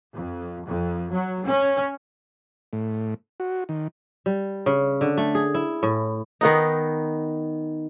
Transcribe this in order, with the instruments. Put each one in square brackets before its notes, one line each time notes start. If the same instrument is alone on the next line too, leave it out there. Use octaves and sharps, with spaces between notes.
[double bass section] F2
F2
F#3
C#4
[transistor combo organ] A2
F#4
D#3
[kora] G3
C#3
D3
A3
G#4
E4
A2
D#3 B3 D#4